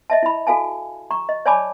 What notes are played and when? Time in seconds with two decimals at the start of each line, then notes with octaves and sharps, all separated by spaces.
0.10 D#5 E5 A5
0.23 E4 B5
0.47 F#4 A4 F5 G#5 A5
1.11 A#5 C#6
1.29 D#5
1.46 C#5 D5 G#5 A5 B5 D6